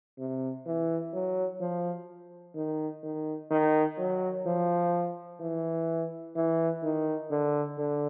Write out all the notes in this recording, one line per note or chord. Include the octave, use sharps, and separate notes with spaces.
C3
E3
F#3
F3
D#3
D#3
D#3
F#3
F3
E3
E3
D#3
D3
D3